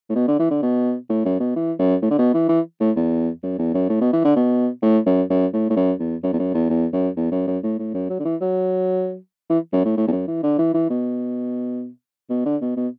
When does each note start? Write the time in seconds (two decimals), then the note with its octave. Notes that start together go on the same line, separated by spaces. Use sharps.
0.09 A2
0.15 B2
0.28 D3
0.39 E3
0.50 D3
0.62 B2
1.09 A2
1.25 F#2
1.40 B2
1.56 E3
1.79 F#2
2.02 A2
2.10 D3
2.18 B2
2.34 E3
2.49 E3
2.80 A2
2.96 E2
3.43 F#2
3.58 E2
3.74 F#2
3.89 A2
4.01 B2
4.13 E3
4.24 D3
4.36 B2
4.82 A2
5.06 F#2
5.30 F#2
5.53 A2
5.70 A2
5.76 F#2
5.99 E2
6.23 F#2
6.33 E2
6.39 F#2
6.54 E2
6.70 E2
6.93 F#2
7.16 E2
7.31 F#2
7.47 F#2
7.63 A2
7.78 A2
7.94 F#2
8.09 F#3
8.19 D3
8.25 E3
8.41 F#3
9.50 E3
9.73 F#2
9.85 A2
9.97 A2
10.07 E2
10.12 F#2
10.27 E3
10.43 D3
10.58 E3
10.74 E3
10.90 B2
12.30 B2
12.45 D3
12.61 B2
12.76 B2